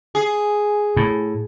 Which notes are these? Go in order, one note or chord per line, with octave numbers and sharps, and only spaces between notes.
G#4
A2